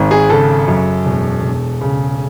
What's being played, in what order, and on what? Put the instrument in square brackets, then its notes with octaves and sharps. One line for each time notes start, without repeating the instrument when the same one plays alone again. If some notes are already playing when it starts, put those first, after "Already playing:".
Already playing: [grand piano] G#1
G#4
C#3 A4
F#2
E1
E1
C#3